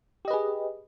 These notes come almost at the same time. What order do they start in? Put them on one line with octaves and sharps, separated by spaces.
G4 D#5 B4 G#4